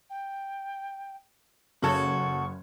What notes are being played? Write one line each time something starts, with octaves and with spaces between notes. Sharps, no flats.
G5
F#1 C#3 F#4 A4 C#6 G#6